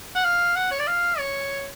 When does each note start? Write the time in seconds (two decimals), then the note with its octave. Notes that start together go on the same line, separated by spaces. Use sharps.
0.16 F#5
0.24 F5
0.56 F#5
0.71 C#5
0.79 D5
0.87 F5
1.19 C#5